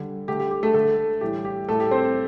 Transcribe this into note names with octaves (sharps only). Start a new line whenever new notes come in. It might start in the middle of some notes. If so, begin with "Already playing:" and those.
Already playing: D3 G3
D3 A3 G4
G4
G4
A3 A4
D3 A3 A4
A2 E3 G3 G4
G4
A2 G3 A3 A4
G4
C4 C5